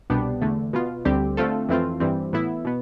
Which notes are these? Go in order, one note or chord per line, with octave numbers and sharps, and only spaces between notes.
C2 B2 B3 D4 G4
E2 D3 A3
B2 B3 F4
D2 D3 G3 C4 G4
D3 A3 C4 F4 A4
F2 E3 A3 C4 F4
G2 E3 G3 C4
A2 E3 B3 E4
B2 B3